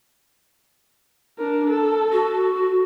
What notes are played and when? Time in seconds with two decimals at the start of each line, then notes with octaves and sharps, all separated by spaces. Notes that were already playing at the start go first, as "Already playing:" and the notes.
1.39 D4 A#4
1.70 A4
2.12 F#4